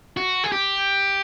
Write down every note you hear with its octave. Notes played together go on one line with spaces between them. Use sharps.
F#4
G#4
G4